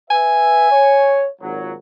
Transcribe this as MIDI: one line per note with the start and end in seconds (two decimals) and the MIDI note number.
0.11 0.69 71
0.11 0.69 76
0.11 1.24 80
0.71 1.28 73
1.42 1.73 32
1.42 1.73 46
1.42 1.73 54